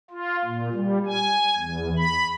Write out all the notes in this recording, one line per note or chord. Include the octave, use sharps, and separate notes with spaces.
F4
A#2
G3
G#5
E2
B5